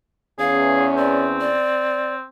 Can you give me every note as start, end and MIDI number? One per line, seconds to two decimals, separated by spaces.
0.39 1.55 40
0.39 1.55 61
0.39 0.87 68
0.39 0.88 77
0.97 2.25 60
0.97 1.25 74
1.41 2.14 74